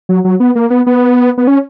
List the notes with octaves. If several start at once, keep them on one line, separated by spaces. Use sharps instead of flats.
F#3
F#3
B3
A#3
B3
B3
B3
C#4